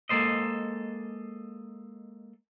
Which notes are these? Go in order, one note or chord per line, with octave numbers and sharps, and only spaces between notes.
G#3 A#3 A4 C5 D#5